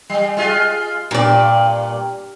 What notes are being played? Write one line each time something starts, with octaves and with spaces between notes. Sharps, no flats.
G3
G#3 F4
G2 A#2 D5